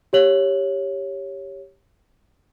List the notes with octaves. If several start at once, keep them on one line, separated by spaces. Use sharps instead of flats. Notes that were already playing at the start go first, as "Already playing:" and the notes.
G4 C#5 F#7